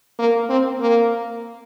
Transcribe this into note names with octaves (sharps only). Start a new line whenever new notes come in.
A#3
C4
A#3